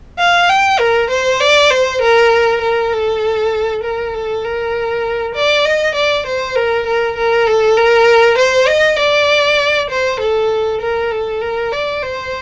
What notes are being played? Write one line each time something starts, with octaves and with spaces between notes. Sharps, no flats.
F5
G5
A#4
C5
D5
C5
A#4
A#4
A4
A#4
A4
A#4
D5
D#5
D5
C5
A#4
A#4
A#4
A4
A#4
C5
D#5
D5
C5
A4
A#4
A4
A#4
D5
C5